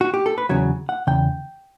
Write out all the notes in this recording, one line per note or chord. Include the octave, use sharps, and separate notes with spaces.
F#4
G4
A4
B4
E2 C#3 F#3 C#5
F#5
E2 C#3 G5